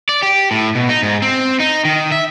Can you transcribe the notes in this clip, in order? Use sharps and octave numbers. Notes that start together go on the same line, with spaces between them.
D5
G4
A2
B2
D#4
G#2
C4
D#4
D#3
E5